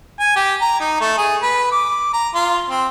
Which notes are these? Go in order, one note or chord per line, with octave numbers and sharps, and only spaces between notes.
G#5
G4
A#5
D#4
A3
G#4
B4
D6
A#5
F4
C4